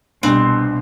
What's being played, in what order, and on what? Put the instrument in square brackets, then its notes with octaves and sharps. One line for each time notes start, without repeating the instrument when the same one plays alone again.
[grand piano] C2 [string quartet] B2 [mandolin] C4 [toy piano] D4